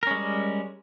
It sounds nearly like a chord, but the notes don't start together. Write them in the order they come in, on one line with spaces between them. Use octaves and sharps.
A#4 C#4 G#3 G3